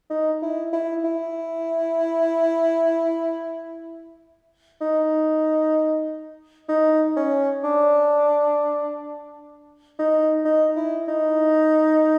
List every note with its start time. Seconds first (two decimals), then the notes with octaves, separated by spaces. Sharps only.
0.10 D#4
0.42 E4
0.73 E4
1.04 E4
4.81 D#4
6.69 D#4
7.16 C#4
7.63 D4
9.99 D#4
10.45 D#4
10.76 E4
11.08 D#4